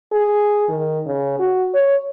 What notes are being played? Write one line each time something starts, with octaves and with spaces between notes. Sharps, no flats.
G#4
D#3
C#3
F#4
C#5